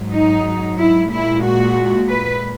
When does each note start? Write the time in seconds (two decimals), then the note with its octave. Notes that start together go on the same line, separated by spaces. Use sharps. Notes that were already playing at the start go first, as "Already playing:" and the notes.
Already playing: G#2 F#3
0.12 D#4
0.78 E4
1.11 A#2 G#3 E4
1.44 F#4
2.09 B4